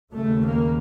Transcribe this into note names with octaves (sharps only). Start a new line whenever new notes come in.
D#2 C#3 A3
A#3